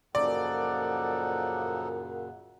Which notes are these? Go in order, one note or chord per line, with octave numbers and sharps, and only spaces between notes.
F#2 A#2 C#3 F3 D#4 A4 D5 F#5